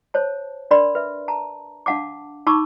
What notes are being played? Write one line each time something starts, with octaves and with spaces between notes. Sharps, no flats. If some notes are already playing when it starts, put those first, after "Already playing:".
C5 C#5 A5
D4 A#4 D5 B5 C6
B4 E5
A5 A#5
D4 F5 F#5 A5 D6
D#4 A5 B5 C#6 D6 E6